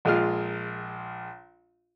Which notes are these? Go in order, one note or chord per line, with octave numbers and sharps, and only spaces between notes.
A#1 G#3 F4 F6